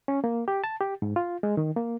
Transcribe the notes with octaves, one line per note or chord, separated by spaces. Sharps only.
C#4
A#3
G4
A5
G4
G#2
F4
G#3
D#3
A#3